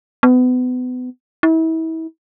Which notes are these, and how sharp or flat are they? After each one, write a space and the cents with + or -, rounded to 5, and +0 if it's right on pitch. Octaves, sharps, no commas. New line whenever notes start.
B3 +30
E4 -35